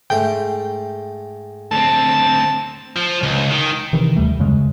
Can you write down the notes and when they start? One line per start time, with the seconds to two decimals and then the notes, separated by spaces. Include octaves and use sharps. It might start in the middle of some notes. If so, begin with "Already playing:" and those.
0.10 G#2 A3 G5
1.72 D2 C4 A5
2.96 F3
3.23 C#2
3.50 D#3
3.93 C3 D#3 E3
4.16 D#2 G3 A3
4.39 F#2 C#3 G#3